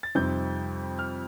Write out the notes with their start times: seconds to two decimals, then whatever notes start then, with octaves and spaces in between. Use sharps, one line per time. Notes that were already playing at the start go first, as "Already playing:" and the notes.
0.03 A6
0.15 F2 C3 G3 C4 D#4 G6
0.99 F6